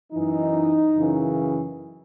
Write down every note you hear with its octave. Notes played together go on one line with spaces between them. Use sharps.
F#2 E3 D#4
F#2 C#3 E3